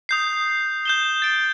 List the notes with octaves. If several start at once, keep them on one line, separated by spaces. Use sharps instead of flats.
D#6 G6 C7
G6 E7 G7
A6 D7